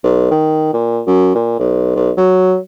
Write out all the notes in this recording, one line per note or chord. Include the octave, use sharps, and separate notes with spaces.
B1
D#3
A#2
F#2
A#2
B1
B1
F#3